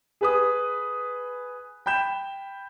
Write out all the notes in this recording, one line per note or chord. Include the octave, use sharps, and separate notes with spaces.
G#4 B4 D#6
G5 B5 G6 E7